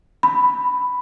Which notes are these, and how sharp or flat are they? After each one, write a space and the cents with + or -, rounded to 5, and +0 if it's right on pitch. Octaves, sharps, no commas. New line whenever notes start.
B5 +5